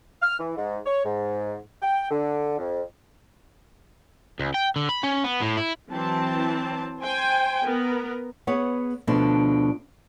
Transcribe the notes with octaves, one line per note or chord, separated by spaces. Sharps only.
F6
E3
G#2
C#5
G#2
G5
D3
F2
C#2
G5
D3
B5
C#4
B3
A2
E4
E3 F#3 C4 A5
C5 G5 G#5
B3 A#4
B3 G#4 B4 C#5 F#5
D2 B2 D3 F3 D4 A5